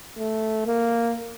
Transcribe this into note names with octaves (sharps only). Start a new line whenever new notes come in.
A3
A#3